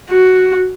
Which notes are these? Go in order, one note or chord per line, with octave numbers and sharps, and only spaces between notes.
F#4